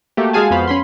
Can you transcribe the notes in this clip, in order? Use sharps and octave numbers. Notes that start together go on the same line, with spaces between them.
A3 A#3 F#4 G4
G#3 F#4 G#4 F5 G#5 A5
F2 B3 F#4 C5 F5 B5
C#4 B5 C6